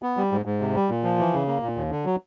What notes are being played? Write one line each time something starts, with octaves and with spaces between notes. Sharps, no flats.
B3
G3
G#2
G#2
C3
G3
A#2
F3
E3
C#3
A#3
A#2
D#2
D3
F#3